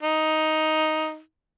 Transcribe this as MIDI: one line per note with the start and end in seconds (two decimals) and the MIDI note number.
0.03 1.19 63